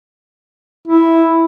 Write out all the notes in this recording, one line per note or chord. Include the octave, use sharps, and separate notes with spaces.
E4